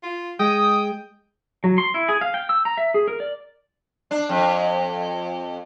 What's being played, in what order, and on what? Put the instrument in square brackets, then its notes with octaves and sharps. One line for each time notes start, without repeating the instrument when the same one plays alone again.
[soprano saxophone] F4
[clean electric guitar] G#3 [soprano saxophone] G5 [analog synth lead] D#6
[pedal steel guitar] F#3
C6
E4
G#4
F5
G5
E6
A#5
E5
G#4
A#4
D5
[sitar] D4
F2